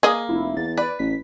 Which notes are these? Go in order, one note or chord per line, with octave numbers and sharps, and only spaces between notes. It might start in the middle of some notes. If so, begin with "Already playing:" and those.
A#3 G#4 D#5
F1 E4
E2 A6
B4 D5
A1 B6